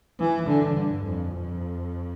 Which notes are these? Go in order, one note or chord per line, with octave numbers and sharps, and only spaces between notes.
E3
D3
G2
F2
F2